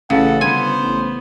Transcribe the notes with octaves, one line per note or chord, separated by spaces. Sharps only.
A1 C#3 A4 F#5
G1 B3 C5 G#5
A1